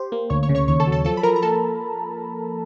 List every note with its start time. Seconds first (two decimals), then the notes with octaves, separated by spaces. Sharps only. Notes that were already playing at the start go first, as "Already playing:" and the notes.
Already playing: G4 C5 C6
0.12 A#3
0.30 D2 C#5 C#6
0.43 C#5 C#6
0.49 C#3
0.55 C#5 C#6
0.68 D#2 C#5 C#6
0.80 A4 A5
0.87 F#3
0.92 A4 A5
1.05 F3 A4 A5
1.17 B5
1.23 F3 A#4 A#5
1.36 A#5
1.42 A#3 A4 A5